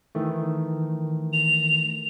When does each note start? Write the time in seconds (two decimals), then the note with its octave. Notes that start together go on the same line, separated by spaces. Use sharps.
0.15 D#3 E3 A3
1.33 F7